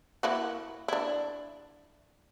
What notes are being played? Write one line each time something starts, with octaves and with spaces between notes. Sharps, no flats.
A#3 E4 F#4
D4 E4